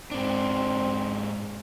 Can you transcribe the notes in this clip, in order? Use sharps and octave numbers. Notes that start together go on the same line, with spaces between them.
G#2 C4 D4